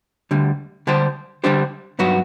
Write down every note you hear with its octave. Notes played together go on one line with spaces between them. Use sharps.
D2 D3 G3
D3 G3 D4 G4 C5
D3 G3 D4 G4 C5
G2 F#3 B3 F#4